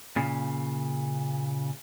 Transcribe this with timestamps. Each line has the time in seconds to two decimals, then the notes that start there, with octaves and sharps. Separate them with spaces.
0.16 A#2 C#3